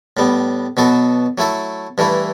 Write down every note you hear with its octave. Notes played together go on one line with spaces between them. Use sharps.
A2 G3 B3
B2 F#3 B3 F#4 A4
F#3 A3 E4 A4
G2 E3 A3 E4